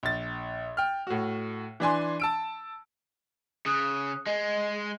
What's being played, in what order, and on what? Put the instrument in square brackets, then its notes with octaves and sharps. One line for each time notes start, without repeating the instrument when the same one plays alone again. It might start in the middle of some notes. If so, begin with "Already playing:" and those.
[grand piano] A#1 A6
G5 F6
A2 F#4
E3 D4 G#5 C6
A5 E6 D7
[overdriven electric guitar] C#3 [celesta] D#6 F#6
[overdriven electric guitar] G#3 [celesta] D#5